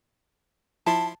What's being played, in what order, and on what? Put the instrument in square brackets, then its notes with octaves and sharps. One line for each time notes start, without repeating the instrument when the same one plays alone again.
[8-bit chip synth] F3 E4 C6 [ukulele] A5